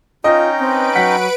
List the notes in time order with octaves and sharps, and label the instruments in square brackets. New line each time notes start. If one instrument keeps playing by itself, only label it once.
[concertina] C#4 D#4 G5 [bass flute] F4 [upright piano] D#5
[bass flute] C4 [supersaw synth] B4 D7
[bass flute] F#3 [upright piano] F#5 B6